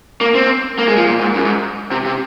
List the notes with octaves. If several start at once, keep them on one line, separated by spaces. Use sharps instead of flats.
A#3
C4
A#3
G#3
F3
A#2
G#2
F#2
G#2
C3
C3